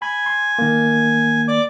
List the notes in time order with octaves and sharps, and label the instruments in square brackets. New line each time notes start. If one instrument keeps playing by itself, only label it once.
[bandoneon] G#5 [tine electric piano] B5 G#6
[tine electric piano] C6
D#3 A#3
[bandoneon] D5 D6